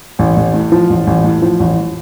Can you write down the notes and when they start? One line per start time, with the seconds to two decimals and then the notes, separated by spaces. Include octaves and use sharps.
0.19 A1
0.36 A1
0.54 A2
0.72 F3
0.90 A1
1.07 A1
1.24 A2
1.42 F3
1.60 A1